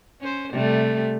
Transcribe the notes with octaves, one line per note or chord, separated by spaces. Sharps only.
C#4 C5
C3 G3 A3